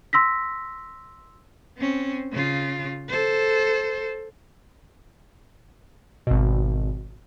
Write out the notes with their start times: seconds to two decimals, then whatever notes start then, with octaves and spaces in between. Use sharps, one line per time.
0.13 C6 E6 A#6 B6
1.78 C4 C#4
2.32 C#3 F4
3.09 A4 C5
6.27 G#1 B2